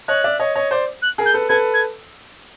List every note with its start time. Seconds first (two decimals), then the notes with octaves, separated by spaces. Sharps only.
0.08 C#5 D#5 F#6
0.24 D5 E5
0.39 C#5 D#5
0.55 C#5 D#5
0.71 C5 D5
1.02 F#6
1.18 G#4 A#4
1.26 G6
1.34 A4 B4
1.49 A4 B4 G#6
1.74 G#6